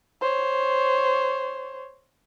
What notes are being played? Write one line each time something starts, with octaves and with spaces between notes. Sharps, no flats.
C5 C#5